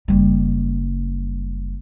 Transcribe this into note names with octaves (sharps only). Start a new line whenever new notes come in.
F#1 G3